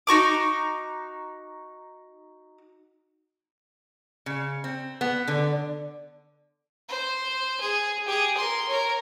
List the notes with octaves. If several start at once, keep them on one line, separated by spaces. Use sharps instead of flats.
D#4 F#4 C#6 D6
C#3
C4
B3
D3
C5
G#4
G4 G#4
A#4 C6
A#4 C#5